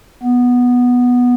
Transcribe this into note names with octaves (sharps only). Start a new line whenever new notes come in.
B3